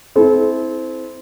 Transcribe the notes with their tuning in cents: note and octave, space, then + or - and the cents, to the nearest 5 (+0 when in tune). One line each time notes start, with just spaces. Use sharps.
C4 -10 E4 -20 A4 -35